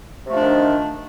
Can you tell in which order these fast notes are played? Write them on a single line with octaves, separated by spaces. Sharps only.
C3 A3 F3 D4 D#3